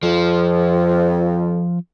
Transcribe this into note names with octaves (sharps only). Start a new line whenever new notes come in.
F2 F3